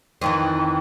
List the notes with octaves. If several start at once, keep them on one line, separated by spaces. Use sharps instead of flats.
F2 D#3 E3